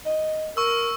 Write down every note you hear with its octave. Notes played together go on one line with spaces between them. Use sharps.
D#5
A#4 C#6 E6